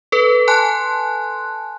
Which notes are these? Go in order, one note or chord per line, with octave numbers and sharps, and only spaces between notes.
A4 B4
G#5 A5 C6 F#6